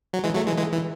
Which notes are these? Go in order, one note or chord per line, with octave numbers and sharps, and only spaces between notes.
F#3
E3 G#3
F#3 A3
E3 G#3
E3 G#3
E3